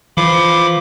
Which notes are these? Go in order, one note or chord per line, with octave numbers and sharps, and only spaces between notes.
E3 F3 B5 D6